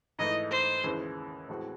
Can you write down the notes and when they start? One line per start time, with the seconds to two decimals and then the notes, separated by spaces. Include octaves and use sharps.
0.19 G#2 E3 A3 D#4 D#5
0.51 C5
0.84 D#2 C#3 E3 G#3
1.48 A2 E3 G#3 C4 F#4